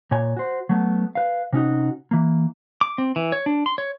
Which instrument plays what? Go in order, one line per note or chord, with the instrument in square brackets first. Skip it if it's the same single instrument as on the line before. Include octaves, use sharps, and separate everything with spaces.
[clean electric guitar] A#2 C#5 G#5
F#4 C5
F#3 A3 B3
B4 F5
C3 C#4 D#4 F#4
E3 A#3
[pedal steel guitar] D6
C4
E3
C#5
D4
C6
C#5